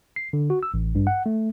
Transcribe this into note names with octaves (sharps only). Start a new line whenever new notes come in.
C7
D3
F#4
E6
A1
G2
F#5
A3